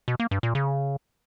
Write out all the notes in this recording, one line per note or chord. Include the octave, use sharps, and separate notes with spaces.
B2
A#3
G2
A#2
C#3